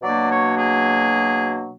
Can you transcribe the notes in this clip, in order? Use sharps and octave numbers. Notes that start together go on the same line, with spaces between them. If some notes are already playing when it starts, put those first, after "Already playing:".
B2 F#3 A#3 D4 D5
C#5
G#4